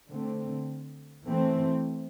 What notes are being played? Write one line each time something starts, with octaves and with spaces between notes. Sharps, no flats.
D3 A3 C4
E3 A3 C4